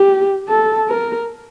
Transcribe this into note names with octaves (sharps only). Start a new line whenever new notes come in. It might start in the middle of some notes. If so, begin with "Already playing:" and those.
Already playing: G4
A4
A#4